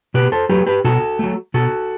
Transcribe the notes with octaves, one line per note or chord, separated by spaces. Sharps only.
B2 G4 B4
A4 C5
F#3 A3 G4 B4
G4 B4
B2 F#4 A4
F#3 A3
B2 F#4 A4